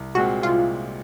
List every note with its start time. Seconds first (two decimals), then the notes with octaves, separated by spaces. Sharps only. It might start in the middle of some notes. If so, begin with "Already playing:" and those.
Already playing: C2
0.15 A#2 G#3 C4 F#4
0.42 C2 F4